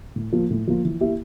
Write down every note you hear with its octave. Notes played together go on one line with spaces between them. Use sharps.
A2
F3 A#3 F4
A2
F3 A#3 F4
E3
A#3 E4 G4